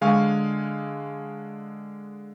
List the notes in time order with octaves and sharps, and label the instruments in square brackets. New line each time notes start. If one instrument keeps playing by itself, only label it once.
[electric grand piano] D3 G#3 F5 G#5 C#6